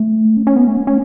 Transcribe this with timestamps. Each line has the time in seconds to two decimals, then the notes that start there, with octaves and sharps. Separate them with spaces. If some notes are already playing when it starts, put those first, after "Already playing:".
Already playing: A3
0.37 C#4
0.47 C#4
0.56 B3
0.67 A3
0.77 C#4
0.87 C#4